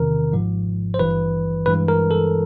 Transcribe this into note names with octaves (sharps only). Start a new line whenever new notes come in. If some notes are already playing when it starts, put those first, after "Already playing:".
Already playing: E2 C3 D#3 A#4
G#1 G#2 F3
C5
G#1 G2 E3 B4
G2 E3 G#3 B4
A#4
A4